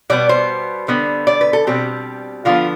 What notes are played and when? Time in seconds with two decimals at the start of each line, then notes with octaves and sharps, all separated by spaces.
0.10 B2 G3 B3 D5
0.29 C5
0.88 D3 G3 B3
1.27 D5
1.41 B4
1.53 A4
1.67 B2 G3 C4 G4
2.45 D3 F3 B3 F4